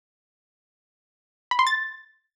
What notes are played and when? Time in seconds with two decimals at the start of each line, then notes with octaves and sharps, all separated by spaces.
1.51 B5
1.59 C6
1.67 A6